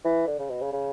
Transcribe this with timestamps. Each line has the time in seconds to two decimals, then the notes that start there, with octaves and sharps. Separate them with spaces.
0.04 E3
0.27 D3
0.39 C#3
0.50 B2
0.61 C#3
0.73 C#3